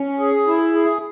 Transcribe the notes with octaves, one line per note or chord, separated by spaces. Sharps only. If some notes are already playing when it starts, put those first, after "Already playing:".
Already playing: C#4
G#4
E4
G#4